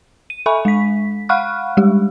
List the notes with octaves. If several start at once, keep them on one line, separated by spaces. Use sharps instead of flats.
D#7
A4 E5 G#5 B5 C#6
G#3 B6
F5 F#5 B5 C#6 F6 F#6
G3 G#3 G4